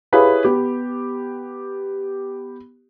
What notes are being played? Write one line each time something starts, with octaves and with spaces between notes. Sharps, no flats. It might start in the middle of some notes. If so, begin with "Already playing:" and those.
E4 G4 G#4 B4 C#5 F5
B3 G4